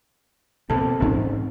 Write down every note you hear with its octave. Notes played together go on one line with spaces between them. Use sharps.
D2 B2 A#3 C4 A4 A5
A1 G#2 C#4 D#4